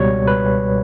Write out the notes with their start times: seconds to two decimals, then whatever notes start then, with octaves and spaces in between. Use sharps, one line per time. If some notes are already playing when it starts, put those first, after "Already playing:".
Already playing: C#2 B2 G3 C#5
0.27 B4